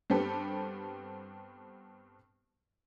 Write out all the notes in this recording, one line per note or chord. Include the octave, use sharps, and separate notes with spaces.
G2 B3 C4 G4 A4